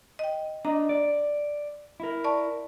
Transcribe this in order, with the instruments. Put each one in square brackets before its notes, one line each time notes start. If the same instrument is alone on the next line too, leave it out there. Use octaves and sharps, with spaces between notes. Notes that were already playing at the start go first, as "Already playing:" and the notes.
[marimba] D#5 G5
[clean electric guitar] D4 D#5 [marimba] A#5
[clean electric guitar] D5
E4 A#4
[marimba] D5 A5 C#6